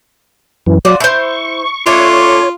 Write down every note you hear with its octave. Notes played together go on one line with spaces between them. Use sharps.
F#2 E3
F#3 F4 F#4 D5
E4 C5 C#6
A3 C#4 D4 F4 C#5